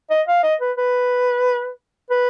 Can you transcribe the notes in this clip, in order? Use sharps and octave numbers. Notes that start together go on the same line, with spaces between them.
D#5
F5
D#5
B4
B4
B4